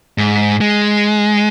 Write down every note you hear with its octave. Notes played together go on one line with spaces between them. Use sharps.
G#2
G#3